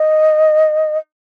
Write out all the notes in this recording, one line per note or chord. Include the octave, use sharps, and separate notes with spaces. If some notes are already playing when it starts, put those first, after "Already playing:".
Already playing: D#5